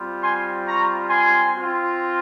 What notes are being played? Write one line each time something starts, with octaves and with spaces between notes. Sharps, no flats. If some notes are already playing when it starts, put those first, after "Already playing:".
Already playing: G3 C4 F4
G#5 C6
A#5 C#6
G#5 C6
C4 F4